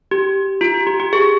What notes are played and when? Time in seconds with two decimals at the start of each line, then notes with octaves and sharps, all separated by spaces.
0.11 G4
0.61 F4
0.74 G4
0.87 G4
1.00 G4
1.13 G#4